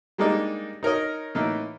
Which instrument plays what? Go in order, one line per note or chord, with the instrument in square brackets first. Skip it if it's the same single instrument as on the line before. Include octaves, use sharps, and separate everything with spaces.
[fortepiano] G3 G#3 A#3 D4 D#4
D#4 A#4 C#5 D#5
A2 E3 A#3 D#4